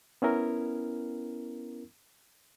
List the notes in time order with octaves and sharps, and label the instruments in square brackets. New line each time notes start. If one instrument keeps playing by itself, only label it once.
[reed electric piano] B3 C#4 E4 A#4